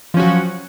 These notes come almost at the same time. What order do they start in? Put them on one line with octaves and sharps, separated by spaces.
F3 C#4 F#4 F#3